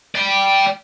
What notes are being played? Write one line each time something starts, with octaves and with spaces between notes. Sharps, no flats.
D5 G5